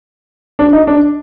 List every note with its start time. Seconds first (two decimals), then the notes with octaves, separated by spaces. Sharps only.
0.59 D4
0.73 D#4
0.87 D4